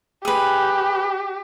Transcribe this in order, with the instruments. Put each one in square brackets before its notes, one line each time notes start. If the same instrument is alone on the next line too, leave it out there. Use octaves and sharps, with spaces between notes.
[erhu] G4 [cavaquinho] G#4 B4